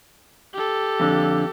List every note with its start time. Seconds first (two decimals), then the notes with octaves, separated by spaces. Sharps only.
0.54 G4 A4
1.00 F2 D3